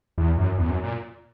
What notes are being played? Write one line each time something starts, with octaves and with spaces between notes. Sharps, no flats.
E2
F#2
E2
F#2
A#2